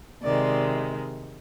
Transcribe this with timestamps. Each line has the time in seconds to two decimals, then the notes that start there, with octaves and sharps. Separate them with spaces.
0.23 C3 D#3 G#3 D5